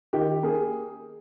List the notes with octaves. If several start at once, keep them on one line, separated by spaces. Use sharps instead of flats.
D#3 G4
A#3 G#4